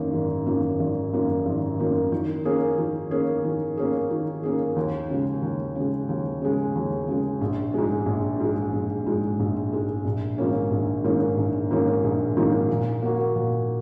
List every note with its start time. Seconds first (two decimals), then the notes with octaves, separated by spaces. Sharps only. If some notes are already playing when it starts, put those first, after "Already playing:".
Already playing: G#1 F#2 D#3 A#3
0.13 G#1
0.46 F#2 D#3 A#3
0.80 G#1
1.13 F#2 D#3 A#3
1.46 G#1
1.79 F#2 D#3 A#3
2.12 D#3
2.45 A#3 C#4 G#4
2.78 D#3
3.11 A#3 C#4 G#4
3.44 D#3
3.77 A#3 C#4 G#4
4.10 D#3
4.43 A#3 C#4 G#4
4.76 D#2
5.10 C#3 G#3
5.42 D#2
5.75 C#3 G#3
6.09 D#2
6.42 C#3 G#3
6.75 D#2
7.08 C#3 G#3
7.41 A#1
7.74 G#2 G#3
8.06 A#1
8.40 G#2 G#3
8.73 A#1
9.06 G#2 G#3
9.40 A#1
9.72 G#2 G#3
10.05 A#1
10.38 G#2 D#3 A#3 C#4
10.71 A#1
11.04 G#2 D#3 A#3 C#4
11.38 A#1
11.71 G#2 D#3 A#3 C#4
12.04 A#1
12.37 G#2 D#3 A#3 C#4
12.69 A#2
13.02 A#3 F#4
13.36 A#2